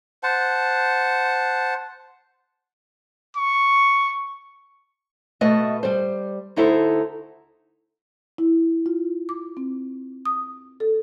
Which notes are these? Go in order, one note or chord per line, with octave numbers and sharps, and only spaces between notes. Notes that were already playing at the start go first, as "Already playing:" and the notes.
C5 F#5 A5
C#6
B2 A3 B4 D#5 E5
G3 C5
D2 D#4 E4 A4 C5
E4
F4
D6
C4
D#6
A4